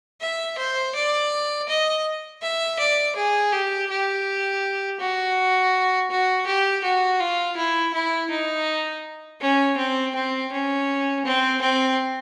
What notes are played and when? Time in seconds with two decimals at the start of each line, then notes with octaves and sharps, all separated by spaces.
0.21 E5
0.58 C5
0.95 D5
1.69 D#5
2.42 E5
2.79 D5
3.16 G#4
3.52 G4
3.90 G4
5.00 F#4
6.11 F#4
6.47 G4
6.84 F#4
7.20 F4
7.57 E4
7.94 E4
8.30 D#4
9.41 C#4
9.77 C4
10.15 C4
10.52 C#4
11.25 C4
11.61 C4